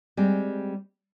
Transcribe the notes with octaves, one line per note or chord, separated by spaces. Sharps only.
G3 G#3 C4